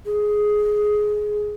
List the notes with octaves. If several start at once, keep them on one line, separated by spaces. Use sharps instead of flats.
G#4